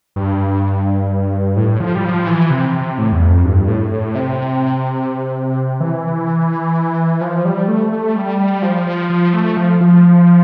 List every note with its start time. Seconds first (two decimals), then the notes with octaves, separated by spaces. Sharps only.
0.16 G2
1.57 A2
1.80 F3
1.95 G3
2.04 F3
2.27 E3
2.50 C3
2.75 C3
2.98 A2
3.12 E2
3.21 F2
3.44 G2
3.68 A2
3.92 A2
4.15 C3
5.80 E3
7.21 F3
7.45 G3
7.68 A3
7.92 A3
8.16 G3
8.39 G3
8.62 F3
8.87 F3
9.10 F3
9.34 A3
9.57 F3
9.81 F3